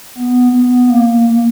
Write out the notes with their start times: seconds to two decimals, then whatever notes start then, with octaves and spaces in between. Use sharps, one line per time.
0.18 B3
0.53 B3
0.88 A#3